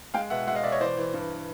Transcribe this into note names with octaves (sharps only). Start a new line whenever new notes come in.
G#3 F5 G5
B2 E5 F#5
G#3 E5 F#5
D#5 F5
B2 D5 E5
C#5 D#5
E3 C5 D5
E3
G2